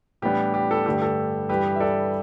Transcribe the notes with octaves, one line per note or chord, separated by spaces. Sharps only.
A2 E3 G3 B3 D4 G4
G4
A4
G2 D3 A3 D4 G4
A4
G2 E3 G3 G4 B4
E5
A4 D5